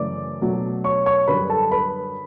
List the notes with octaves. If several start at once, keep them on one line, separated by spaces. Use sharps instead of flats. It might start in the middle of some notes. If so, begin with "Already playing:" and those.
Already playing: F#2 C#3 E3 A3 D5 D6
B2 F#3 A3 D4
C#5 C#6
C#5 C#6
F#2 D3 G3 B4 B5
A4 A5
B4 B5